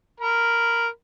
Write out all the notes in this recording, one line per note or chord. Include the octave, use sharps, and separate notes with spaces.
A#4 B5